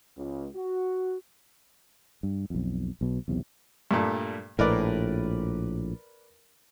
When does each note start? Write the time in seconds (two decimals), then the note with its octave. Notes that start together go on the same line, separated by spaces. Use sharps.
0.17 C#2
0.56 F#4
2.23 G2
2.50 B1 F2
3.01 B1 B2
3.28 B1 E2 C3
3.91 G2 A#2 A3
4.59 A#1 A2 A#4 B4 D5